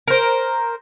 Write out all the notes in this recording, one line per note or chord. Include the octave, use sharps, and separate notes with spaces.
A#4 C5